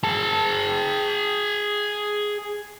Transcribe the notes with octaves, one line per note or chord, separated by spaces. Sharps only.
G#4 A5